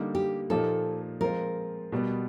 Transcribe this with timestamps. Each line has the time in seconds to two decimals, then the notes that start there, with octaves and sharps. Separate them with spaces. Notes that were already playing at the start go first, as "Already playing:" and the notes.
Already playing: D3 G3 A#3 D#4
0.15 G4
0.50 A#2 F3 A#3 D#4 A4
1.21 F3 G#3 C4 F4 A#4
1.92 B2 G3 B3